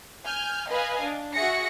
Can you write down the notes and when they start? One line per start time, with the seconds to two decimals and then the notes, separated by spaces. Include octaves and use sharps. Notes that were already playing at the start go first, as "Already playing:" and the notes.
0.25 G#5 F6 G6
0.69 B4 D#5 F5 G#5
1.01 D4
1.34 F#4 G#4 E5 A#6 C#7